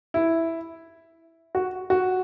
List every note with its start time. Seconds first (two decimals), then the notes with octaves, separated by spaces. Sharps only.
0.14 E4
1.55 F#4
1.90 F#4